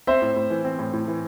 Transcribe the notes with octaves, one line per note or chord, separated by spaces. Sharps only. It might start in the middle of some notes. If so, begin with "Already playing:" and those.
C4 C5 E5
A2
A2
E3
C4
A2
A2
E3